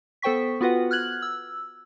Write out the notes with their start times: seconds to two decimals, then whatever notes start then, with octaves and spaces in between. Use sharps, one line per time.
0.22 B3 A4 C5 G5 C#6 B6
0.61 B3 F4 F#4 B4 F#5
0.91 F6 F#6 G#6 F#7
1.22 E6